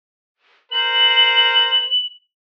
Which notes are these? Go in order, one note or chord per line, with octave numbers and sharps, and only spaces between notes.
A#4 C5 F#7